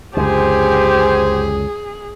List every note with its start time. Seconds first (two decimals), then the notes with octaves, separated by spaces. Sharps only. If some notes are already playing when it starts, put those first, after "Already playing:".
0.17 C#2 F#2 D3 G4 G#4 C5 G#5